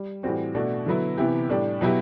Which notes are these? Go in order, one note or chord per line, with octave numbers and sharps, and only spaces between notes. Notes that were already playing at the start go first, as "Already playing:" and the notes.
Already playing: G3
A2 E3 G3 C4 F#4
B2 A3 D4 F#4
D3 F#3 B3 E4
C3 E3 B3 E4 G4
A2 G3 D4 G4
B2 F#3 B3 E4 G4